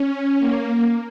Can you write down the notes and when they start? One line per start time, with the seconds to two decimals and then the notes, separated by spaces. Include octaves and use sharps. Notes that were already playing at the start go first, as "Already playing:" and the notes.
Already playing: C#4
0.39 A#3